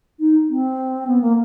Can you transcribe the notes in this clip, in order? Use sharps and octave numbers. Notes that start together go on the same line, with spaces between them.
D#4
C4
B3
A#3